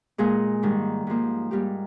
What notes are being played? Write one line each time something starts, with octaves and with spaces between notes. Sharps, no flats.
A#2 G#3 G#4
G#2 D#3 G3
G#2 F3 A#3
G#2 G3 A#3 G4